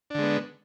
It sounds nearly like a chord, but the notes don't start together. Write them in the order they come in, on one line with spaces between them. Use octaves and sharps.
D4 D3 G#3 B3